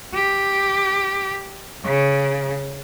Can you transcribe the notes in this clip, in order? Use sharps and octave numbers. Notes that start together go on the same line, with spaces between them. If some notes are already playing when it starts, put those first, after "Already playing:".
G4
C#3